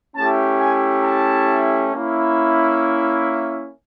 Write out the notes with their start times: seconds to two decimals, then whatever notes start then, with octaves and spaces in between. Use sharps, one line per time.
0.15 A3 C#4 E4 G4 A5
0.60 G#5
1.05 A5
1.94 A#3 C#4 E4